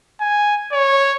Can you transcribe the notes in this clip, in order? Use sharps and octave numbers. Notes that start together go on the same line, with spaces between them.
G#5
C#5